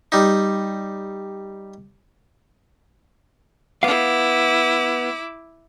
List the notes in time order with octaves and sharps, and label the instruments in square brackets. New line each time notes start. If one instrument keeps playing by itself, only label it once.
[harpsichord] G3 D#4
[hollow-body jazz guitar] B3 F5 [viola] E4 D6